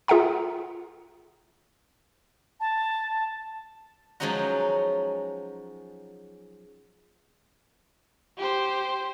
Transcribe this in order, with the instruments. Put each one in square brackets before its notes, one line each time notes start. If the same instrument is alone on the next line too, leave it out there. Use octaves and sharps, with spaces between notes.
[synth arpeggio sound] F4 G#4 E5 F#5 A#5
[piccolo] A5
[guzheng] F3 F#3 G#3 C#4 D#4 F#4
[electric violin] G4 C5